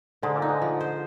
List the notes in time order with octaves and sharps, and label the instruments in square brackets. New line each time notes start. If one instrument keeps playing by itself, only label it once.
[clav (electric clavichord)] G#2 G#3 [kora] D3
[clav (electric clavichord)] A#2 A#3
[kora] D#4
[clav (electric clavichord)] G#2 G#3
[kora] F3
C5